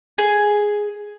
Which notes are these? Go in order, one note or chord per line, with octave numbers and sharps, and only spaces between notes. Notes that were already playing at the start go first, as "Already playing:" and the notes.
G#4